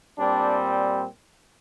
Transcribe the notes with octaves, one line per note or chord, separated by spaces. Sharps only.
A#2 G3 C4 D4